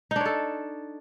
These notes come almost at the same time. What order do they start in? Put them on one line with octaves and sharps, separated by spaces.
D#4 D4 C#5 A4